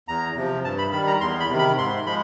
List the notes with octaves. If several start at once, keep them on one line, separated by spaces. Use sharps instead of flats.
E2 A#5
C3 F3
G2 A5
B5
D#3 G3 B5
A#5
E2 C6
B5
C3 D#3
B5
G#2 C6
F3 G#3 B5